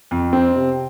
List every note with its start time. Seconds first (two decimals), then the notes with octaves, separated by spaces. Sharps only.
0.11 F2
0.33 C4
0.55 C3